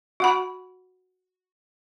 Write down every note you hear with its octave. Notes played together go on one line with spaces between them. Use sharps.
F#4 F#5 B5